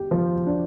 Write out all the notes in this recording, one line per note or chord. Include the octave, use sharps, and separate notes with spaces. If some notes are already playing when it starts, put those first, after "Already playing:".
Already playing: G4
F3
D4